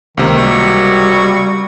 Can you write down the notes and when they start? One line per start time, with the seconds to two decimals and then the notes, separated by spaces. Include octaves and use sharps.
0.17 C#2 C3 D#3 A#3
0.39 F#3 G3 C#6